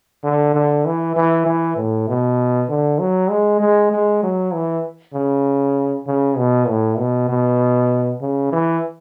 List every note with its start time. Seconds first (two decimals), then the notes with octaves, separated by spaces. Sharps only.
0.24 D3
0.54 D3
0.85 E3
1.16 E3
1.46 E3
1.77 A2
2.08 B2
2.69 D3
3.00 F#3
3.30 G#3
3.60 G#3
3.91 G#3
4.23 F#3
4.54 E3
5.14 C#3
6.07 C#3
6.37 B2
6.68 A2
6.99 B2
7.29 B2
8.21 C#3
8.53 E3